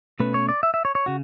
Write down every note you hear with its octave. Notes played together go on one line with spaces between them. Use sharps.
B2 A3 C#4 B4
C#5
D5
E5
E5
C#5
C#5
C#3 F#4